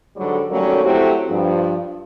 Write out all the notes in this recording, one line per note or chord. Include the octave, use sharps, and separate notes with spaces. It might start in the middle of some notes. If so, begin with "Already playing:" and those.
G#2 D3 F#3 G3
D#3 F#3 G3 A3 A#3 C#4
F#3 A3 C4 E4 F#4 G4
G2 F3